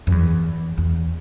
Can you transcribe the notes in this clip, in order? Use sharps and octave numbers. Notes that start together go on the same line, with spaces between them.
F#2
E2
E2